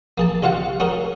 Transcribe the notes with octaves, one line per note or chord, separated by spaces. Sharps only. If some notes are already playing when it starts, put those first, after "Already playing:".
A#3 G#4 A5
C2 F4 F#4 F5 F#5
C#4 F#4 G#4 A#4